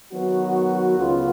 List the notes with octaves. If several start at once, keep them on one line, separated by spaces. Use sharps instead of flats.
D#3 F#3 B3 F#4
C#2 C#3 G#3 B3 F4